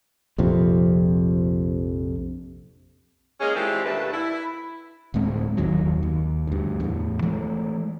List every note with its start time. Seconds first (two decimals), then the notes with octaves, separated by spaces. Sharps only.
0.38 A#1 F2 C3
3.40 G#3 A#3 C#4 G#4
3.56 E3 G#3 C4 D4 F4 G4
3.85 D#2 B2 A3 D4 B4
4.13 E4
5.14 D1 A2 G#3 C4
5.57 F#1 D#2 D#3 F#3
6.03 D#2
6.47 D2 G2
6.80 E2 A2
7.23 E3 G#3 A3